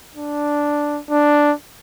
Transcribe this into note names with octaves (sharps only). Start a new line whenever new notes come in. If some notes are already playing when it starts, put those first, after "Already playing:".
D4
D4